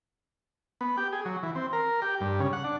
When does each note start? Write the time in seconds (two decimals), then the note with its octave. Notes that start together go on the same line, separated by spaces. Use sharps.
0.81 B3
0.98 G4
1.13 G#4
1.25 F#3
1.43 E3
1.55 C4
1.73 A#4
2.02 G4
2.21 G2
2.40 C#3
2.53 F#5
2.64 D4